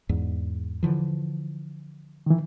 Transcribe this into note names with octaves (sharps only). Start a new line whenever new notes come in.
E2 G#2
D3 E3 F3
D#3 E3